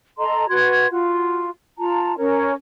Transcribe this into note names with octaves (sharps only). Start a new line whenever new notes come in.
A4 D#5 A#5 C6
F#4 B4 C6 G#6
F4 F#4
F4 A5 A#5
C#4 A#4 C#5